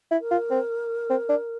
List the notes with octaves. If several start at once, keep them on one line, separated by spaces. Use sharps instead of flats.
E4
A#4
F4
C4
C4
D4